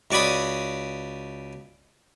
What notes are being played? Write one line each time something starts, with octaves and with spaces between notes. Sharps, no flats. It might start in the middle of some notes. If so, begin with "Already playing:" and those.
C#2 F#4 D5 G#5 B5 D#6